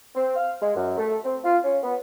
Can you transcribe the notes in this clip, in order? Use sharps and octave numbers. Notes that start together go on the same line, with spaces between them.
C4
F5
G#3
F#2
A3
C4
F4
C#4
B3